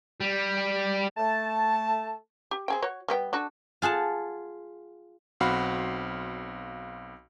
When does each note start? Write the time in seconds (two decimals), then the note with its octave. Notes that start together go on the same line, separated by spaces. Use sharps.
0.21 G3
1.17 A3 A5
2.51 G4
2.68 C4 G#4 G5
2.82 F#4 C#5
3.08 G3 B3 G5
3.33 D4 F#4 A4
3.82 F4 G#4 F#5 A5
5.40 B1 C4 F#4 F5 B5